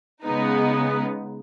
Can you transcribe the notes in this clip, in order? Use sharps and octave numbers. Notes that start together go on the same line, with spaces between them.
C#3 G#3 B3 D#4